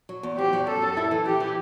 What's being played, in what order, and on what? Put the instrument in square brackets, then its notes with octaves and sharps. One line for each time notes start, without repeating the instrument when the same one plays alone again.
[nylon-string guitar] F#3
E2
[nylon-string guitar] C4 [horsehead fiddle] G4
[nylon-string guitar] F#3
[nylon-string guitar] F#2 [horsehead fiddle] A4
[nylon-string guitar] F#2
E4
E3
[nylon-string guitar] E4 [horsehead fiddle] G4
[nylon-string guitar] E3